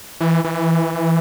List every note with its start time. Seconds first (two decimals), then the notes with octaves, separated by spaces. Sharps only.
0.21 E3
0.44 E3